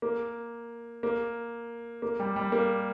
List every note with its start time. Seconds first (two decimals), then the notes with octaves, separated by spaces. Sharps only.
0.02 A#3
1.03 A#3
2.02 A#3
2.20 G3
2.36 G3
2.52 A#3